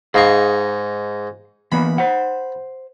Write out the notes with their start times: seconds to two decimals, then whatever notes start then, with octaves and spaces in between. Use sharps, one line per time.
0.14 G#2 D#4 G#4 F5 C#6
1.72 E3 A#3 B3 B5
1.98 C5 F#5